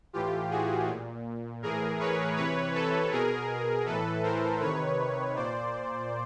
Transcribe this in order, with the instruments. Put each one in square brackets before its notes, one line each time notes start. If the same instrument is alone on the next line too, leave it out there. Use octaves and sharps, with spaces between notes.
[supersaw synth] A2 E3 F4 G4
F#4 G#4
A#2
A2 E3 G#4 A#4
B4 C#5
C3 E3 B4 C#5
A4 B4
B2 G#4 A#4
A2 E3 A4 B4
A#4 C5
C3 D#3 B4 C#5
A#2 C5 D5